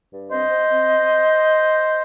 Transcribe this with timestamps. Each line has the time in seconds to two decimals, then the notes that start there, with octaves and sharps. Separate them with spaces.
0.12 G2
0.30 C4 C5 D#5
0.49 C4
0.67 C4